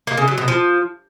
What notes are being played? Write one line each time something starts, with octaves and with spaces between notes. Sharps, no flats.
A#3
C#3
F#3
B2
F3